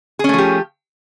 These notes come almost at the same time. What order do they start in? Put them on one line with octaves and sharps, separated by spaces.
G#4 C#4 A3 F3 G4